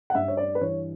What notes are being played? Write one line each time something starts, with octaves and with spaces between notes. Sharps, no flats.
F#5
G2 E5
C#5
D5
B4
E3 C#5